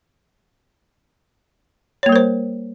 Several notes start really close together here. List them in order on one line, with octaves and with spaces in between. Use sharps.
C#5 A#3 G3 A#4 C5